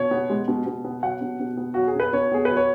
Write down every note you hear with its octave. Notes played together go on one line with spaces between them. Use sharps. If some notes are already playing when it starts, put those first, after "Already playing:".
Already playing: B2 C#5
B3
G#3
B2
B2
B3
F#3 F#5
B2
B2
B3
F#3 F#4
G#4
B2 B4
B2 C#5
B3 G#4
F#3 B4
C#5